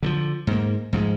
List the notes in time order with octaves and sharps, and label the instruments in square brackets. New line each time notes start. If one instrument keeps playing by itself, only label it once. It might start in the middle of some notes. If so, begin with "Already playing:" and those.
[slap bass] D3 D#3 F3
G#2 A#3
G#2 F3 G3 G#3